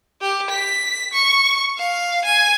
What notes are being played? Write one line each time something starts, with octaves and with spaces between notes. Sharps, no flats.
G4
B6
C#6
F5
G#5